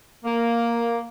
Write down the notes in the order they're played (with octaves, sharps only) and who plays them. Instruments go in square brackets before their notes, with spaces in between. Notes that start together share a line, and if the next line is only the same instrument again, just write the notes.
[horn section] A#3